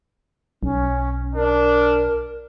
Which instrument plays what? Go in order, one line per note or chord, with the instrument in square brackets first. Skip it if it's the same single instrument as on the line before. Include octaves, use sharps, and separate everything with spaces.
[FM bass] B1 [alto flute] C#4
[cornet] D4 [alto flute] A#4